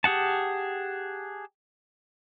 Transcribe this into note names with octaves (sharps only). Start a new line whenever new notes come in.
G4 G#4 F#5 A5